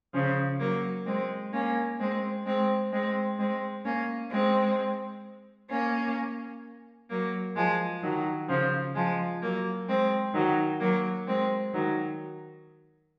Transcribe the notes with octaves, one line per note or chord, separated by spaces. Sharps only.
C#3 F3
F#3 A#3
G#3 C4
A#3 C#4
G#3 C4
G#3 C4
G#3 C4
G#3 C4
A#3 C#4
G#3 C4
A#3 C#4
F#3 A#3
F3 G#3
D#3 F#3
C#3 F3
F3 G#3
F#3 A#3
G#3 C4
D#3 F#3
F#3 A#3
G#3 C4
D#3 F#3